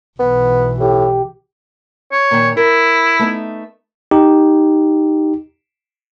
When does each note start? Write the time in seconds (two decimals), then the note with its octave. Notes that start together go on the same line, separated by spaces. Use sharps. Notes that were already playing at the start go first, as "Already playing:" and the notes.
0.19 B1 E3 B3
0.80 A2 G4
2.12 C#5
2.31 A#2 D#3
2.57 E4 A#4
3.19 A3 B3 D#4
4.11 D#4 G4